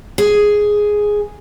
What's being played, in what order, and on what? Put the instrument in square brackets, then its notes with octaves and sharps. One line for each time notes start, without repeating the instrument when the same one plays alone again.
[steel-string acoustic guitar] G#4